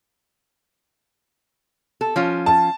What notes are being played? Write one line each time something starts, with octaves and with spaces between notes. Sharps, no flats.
A4
F3 C#4 F4
A5